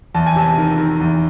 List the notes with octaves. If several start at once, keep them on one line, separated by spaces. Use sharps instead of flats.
E2 A5
G#5
C3 A5
D#3
D#3
E2